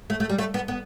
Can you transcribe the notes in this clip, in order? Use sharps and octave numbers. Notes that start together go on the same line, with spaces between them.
A3
A3
G3
A3
B3
B3